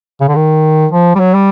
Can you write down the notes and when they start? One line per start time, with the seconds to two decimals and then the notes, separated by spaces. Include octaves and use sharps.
0.21 C#3
0.29 D3
0.36 D#3
0.92 F3
1.16 G3
1.20 F#3
1.35 G3